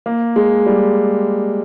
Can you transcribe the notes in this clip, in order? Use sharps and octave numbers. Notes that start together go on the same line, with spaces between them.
A#3
G#3
G3